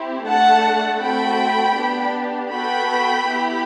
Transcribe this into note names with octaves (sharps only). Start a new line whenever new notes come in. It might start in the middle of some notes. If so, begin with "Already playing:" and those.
Already playing: C4 E4 G4
A3 D4 A4 F#5 A5
A3 C4 F#4 A4 G5 B5
B3 D4 G4
B3 F#4 A4 G5 B5
B3 E4 G4